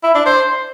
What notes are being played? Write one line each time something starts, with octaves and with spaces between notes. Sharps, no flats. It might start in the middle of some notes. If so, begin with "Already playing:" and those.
E4
D4
C5